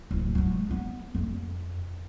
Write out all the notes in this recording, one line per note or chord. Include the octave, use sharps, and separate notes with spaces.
D1
F#3 G#3
B3
F2